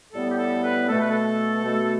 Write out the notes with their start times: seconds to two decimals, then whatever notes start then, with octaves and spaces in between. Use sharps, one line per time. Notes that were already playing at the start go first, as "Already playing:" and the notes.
0.13 A2 G3 B3 A4
0.31 G4
0.38 A4
0.64 B4
0.89 B2 A3 A4
1.00 B4
1.11 A4
1.65 B2 A3